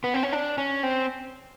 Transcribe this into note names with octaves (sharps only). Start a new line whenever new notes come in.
B3
C4
C#4
D4
C#4
C4